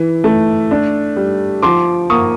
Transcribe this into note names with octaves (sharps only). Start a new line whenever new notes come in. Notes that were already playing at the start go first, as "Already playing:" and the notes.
Already playing: E3
A3
D4
G3
F3 C6 D6
A#3 C#6 D#6